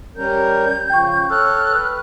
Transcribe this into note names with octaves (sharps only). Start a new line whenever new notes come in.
G3 C#4 A#4 G6
C#3 F3 G5 C#6
A4 C#5 F6 F#6
B4